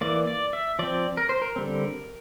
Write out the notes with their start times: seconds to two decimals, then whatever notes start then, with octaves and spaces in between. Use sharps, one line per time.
0.01 E3 A#3 D5
0.27 D5
0.53 E5
0.79 F3 C4 D5
1.17 A#4
1.29 C5
1.42 A#4
1.56 D3 G3 C4